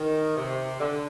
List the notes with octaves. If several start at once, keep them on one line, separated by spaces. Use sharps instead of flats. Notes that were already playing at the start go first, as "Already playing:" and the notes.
Already playing: D#3
C3
D3